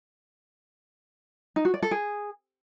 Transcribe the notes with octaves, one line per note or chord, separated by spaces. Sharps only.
D#4
F#4
D5
A4
G#4